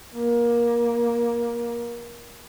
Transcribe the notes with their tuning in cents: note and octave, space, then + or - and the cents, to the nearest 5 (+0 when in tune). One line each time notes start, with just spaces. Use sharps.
A#3 +20